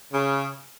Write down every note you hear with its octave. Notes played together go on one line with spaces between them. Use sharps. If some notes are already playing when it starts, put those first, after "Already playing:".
C#3